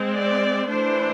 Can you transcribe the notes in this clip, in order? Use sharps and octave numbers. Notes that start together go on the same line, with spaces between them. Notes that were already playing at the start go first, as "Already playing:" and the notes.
Already playing: G#3 C4
D5
E3 A3 D4 C5